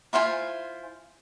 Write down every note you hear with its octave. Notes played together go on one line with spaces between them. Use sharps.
E4 F4 C5 G#5